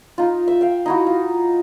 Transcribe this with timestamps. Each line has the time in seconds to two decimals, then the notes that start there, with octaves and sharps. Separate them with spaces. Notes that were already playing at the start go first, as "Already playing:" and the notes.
0.18 D#4 F4
0.48 E5
0.61 F5 G5
0.86 D#4 E4 F#4
1.07 F4